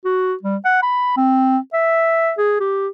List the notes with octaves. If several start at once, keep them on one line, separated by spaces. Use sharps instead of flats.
F#4
G3
F#5
B5
C4
E5
G#4
G4